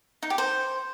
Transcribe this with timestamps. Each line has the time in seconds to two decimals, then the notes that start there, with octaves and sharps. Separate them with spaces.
0.23 D#4
0.30 G4
0.38 C5